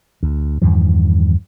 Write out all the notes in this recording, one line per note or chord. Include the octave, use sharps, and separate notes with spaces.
D2
E2 G2 D#3 F3